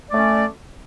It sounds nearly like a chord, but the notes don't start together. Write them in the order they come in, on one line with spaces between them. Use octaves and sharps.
D5 A3 C#4